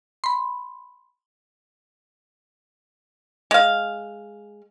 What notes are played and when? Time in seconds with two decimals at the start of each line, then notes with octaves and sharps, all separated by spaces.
0.24 B5 C6
3.51 G#3 F5